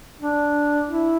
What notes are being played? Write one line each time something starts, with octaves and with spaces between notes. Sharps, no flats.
D4
E4